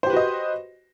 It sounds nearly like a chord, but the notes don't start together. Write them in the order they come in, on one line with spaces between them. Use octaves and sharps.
C5 G4 B4 F#4 D#5